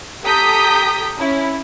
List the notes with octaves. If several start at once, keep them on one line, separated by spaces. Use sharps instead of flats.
G4 A4 A#5 D#6 G6 B6
C#4 E4